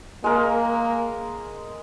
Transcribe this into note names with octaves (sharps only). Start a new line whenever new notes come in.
G#3 A#3 A#4